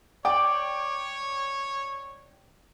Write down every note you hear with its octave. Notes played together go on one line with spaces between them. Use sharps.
C#5 D5 G5